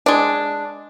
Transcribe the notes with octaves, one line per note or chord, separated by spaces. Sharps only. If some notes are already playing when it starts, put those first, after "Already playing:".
G#3 D4